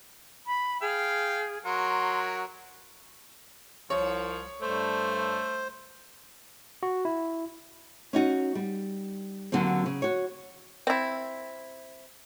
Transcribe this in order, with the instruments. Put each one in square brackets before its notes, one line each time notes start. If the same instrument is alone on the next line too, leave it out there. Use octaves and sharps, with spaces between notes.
[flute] B5
[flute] G#4 [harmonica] F5 G5
[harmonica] F#3 F#4 A#4 [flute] C6
[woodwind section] C2 [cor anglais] F3 [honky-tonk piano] C#5
[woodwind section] G2 G3 A4 [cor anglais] A3 [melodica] C5
[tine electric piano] F#4
E4
[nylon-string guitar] C#4 D#4 F#4
G3
D#2 D3 F#3 A#3 C4
C#3
F#4 C#5
[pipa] C4 E4